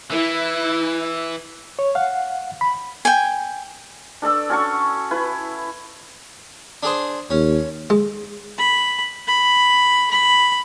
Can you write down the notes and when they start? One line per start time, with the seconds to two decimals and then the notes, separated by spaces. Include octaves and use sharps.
0.10 E3 E4
1.79 C#5
1.95 F5 F#5
2.61 B5
3.05 G5 G#5
4.22 D4 A4 D5 E6
4.49 C#4 F#4 A5 C#6
5.11 E4 B4
6.83 D4 G#4 C5
7.30 D#2 C#4
7.90 G#3
8.59 B5
9.28 B5
10.11 B5